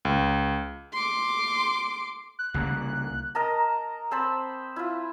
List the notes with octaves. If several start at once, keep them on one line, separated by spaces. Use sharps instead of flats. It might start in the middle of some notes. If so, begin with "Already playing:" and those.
C#2
C6 D6
F#6
C2 C#3 A#3
A#4 D#5 A5 A#5
C4 C5 A5 B5
E4 F4